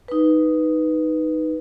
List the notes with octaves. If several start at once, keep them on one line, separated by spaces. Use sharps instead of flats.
D#4 B4